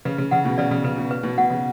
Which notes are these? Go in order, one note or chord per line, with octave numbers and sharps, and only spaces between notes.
C#3 B4
C#3
C#3 F#5
B2
C#3 D5
C#3
C#3 B4
B2
B4
B2
B2 F#5
C#3